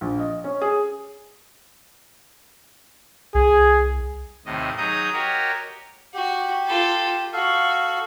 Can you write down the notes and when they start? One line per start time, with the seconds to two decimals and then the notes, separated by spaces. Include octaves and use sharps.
0.01 A#1
0.19 D#5
0.44 C#4
0.61 G#4
3.34 C2 G#4
4.46 D#2 A2 C3 D#5
4.78 F#3 D#4 G#4 D#5 D#6 G6
5.13 F#4 G4 A#4 C#5 D#5
6.14 F#4 G4
6.67 F4 A4
7.33 F#4 A4 F5